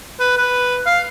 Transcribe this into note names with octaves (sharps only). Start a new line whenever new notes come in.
B4
B4
F5